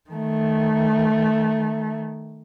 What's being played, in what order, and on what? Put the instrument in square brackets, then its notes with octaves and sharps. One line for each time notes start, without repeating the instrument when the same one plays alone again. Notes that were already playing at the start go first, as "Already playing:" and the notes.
[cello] D#3 A3